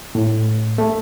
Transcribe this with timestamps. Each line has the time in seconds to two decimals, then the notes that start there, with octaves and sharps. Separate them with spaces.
0.15 A2
0.78 A3